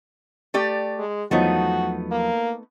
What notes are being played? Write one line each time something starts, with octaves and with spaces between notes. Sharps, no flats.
A3 G4 D5
G#3
E2 F3 F#3 A3 B3 D#4 F#4
A#3